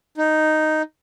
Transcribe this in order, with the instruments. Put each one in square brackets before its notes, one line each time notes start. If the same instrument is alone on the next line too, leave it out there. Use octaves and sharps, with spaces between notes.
[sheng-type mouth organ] D#4